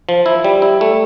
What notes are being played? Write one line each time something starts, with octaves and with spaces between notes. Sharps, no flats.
F3
E4
G3
E4
A3